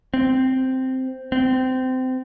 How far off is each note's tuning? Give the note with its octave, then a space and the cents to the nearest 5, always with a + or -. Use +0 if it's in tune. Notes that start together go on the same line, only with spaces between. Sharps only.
C4 -5
C4 -25